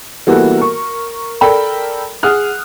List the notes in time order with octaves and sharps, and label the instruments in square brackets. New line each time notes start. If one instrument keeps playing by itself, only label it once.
[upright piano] E3 G3 A#3 B3 F#4 A4
A#4 C#6
A4 A#4 D5 G5 B5
G#4 F#5 D#6 F6 F#6